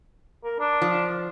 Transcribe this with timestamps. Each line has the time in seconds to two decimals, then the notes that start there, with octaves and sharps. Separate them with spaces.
0.44 A#4
0.60 D4
0.82 F3